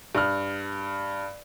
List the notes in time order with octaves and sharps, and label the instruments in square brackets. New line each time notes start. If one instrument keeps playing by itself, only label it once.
[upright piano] G2 F6